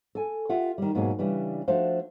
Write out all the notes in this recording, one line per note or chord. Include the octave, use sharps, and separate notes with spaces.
A4 G#5
F4 G4 E5 F#5
D#3 G3
G#2 B2 F#3 A#3 G#4
C#3 E3 G3 D4 B4
F3 A3 D4 F#4 C5 F5